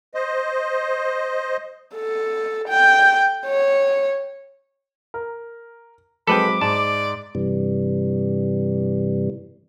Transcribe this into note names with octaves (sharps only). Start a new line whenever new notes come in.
C5 D#5
A4
G5
C#5
A#4
F#3 G#3 C4 A4 B4 G5 B5 D6
G#2 D5 A5
G2 C3 E3 G3